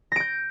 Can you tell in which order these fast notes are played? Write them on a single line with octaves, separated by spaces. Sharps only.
A#6 D7 G6